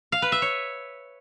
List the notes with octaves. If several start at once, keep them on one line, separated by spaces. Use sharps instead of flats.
F5
B4
E5
C#5